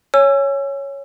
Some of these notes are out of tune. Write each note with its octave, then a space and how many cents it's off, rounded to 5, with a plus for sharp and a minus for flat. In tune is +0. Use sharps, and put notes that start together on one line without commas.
C#5 +0 G#5 +0 E6 +35